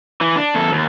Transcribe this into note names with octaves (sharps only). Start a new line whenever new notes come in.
E3
D4
E2 A4
D#2